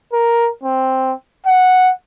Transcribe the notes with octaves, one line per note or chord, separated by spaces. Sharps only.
A#4
C4
F#5